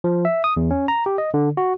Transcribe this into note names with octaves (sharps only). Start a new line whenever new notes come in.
F3
E5
D#6
E2
C#4
A#5
G4
D#5
D3
F#4